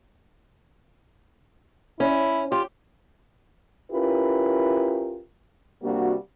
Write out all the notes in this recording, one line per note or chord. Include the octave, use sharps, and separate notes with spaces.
C#4 E4
F4 G4
C#4 E4 F4 G4 A#4 B4
C3 G3 A#3 D4 F#4